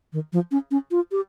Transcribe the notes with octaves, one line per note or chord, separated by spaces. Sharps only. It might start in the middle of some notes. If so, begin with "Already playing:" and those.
D#3
F3
C#4
C#4
F4
G4